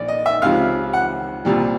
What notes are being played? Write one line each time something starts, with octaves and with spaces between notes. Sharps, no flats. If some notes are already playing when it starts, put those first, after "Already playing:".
Already playing: A#1 D5
D#5
E5
C#2 C3 F3 F5
F#5
C2 A#2 G3